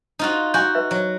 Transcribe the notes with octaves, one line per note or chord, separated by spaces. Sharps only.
D#4 F4 F#4
F#4 D#5 G#5 G6
B4 E5
F#3